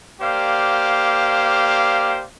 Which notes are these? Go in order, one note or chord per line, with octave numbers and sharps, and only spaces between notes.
A#3 G4 C5 D5 F5